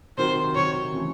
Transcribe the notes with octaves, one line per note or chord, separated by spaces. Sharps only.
C3 D#3 F#3 C5
C3 D#3 F#3 C#5
C#3 E3 A3